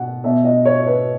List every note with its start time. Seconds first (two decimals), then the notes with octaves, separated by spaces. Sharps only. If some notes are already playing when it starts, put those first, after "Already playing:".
Already playing: B2 F#5
0.24 B2 E5
0.44 D#5
0.65 C#5
0.86 B4